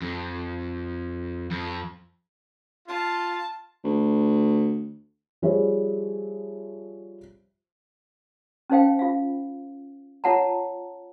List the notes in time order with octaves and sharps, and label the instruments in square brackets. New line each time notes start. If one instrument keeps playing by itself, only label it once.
[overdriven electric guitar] F2
F2
[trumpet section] F4 [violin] A5
[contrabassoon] D2
[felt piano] F3 G3 G#4 C5 C#5 E5
[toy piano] C#4 D#4 C5 F5 G5
F4 F5
F4 C#5 F#5 A5 A#5